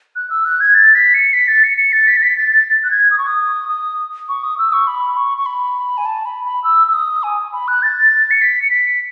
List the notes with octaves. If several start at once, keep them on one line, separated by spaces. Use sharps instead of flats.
F#6
E6
F#6
G#6
A6
B6
C#7
B6
A6
C#7
C#7
A6
B6
A6
B6
A6
A6
F#6
G#6
D#6
C#6
D#6
D#6
C#6
D#6
E6
C#6
B5
C#6
C#6
B5
G#5
A5
B5
B5
E6
E6
D#6
G#5
B5
F#6
A6
C#7
B6
C#7
B6